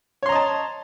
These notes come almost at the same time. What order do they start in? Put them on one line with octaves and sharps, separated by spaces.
C#5 C6 A#5 D#5 A5